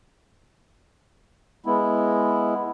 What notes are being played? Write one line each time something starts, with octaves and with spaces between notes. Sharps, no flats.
G#3 B3 E4